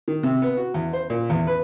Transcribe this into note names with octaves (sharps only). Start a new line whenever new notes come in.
D#3
C3
B3
F#4
E2
C5
A#2
E2
B4